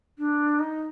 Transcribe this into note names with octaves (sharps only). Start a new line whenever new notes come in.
D4
D#4